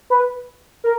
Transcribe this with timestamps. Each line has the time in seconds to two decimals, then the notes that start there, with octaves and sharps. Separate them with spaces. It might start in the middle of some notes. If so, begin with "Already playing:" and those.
0.10 B4
0.84 A#4